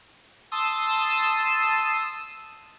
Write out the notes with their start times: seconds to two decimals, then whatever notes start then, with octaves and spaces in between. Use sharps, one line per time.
0.51 A5 C6 D#6 E6